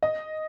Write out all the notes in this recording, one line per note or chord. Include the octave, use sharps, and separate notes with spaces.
D#5